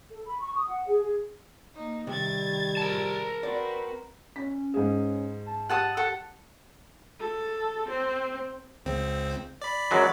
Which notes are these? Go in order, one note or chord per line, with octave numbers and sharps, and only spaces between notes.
A4
B5
C#6
D#6
F#5
G#4
G#4
A#3 D#4
C3 D#3 G3 G#6 A6
A#4 A5
C4 F#4 B4 D5
C#4 B6
G#2 G#4
A5
G4 F#5 A5 D#6
A4 F#5
A4
C4
C#2 C4
D5 B5
F#2 F#3 G#3